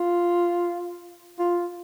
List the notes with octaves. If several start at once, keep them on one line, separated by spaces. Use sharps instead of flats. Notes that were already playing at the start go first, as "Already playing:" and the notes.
Already playing: F4
F4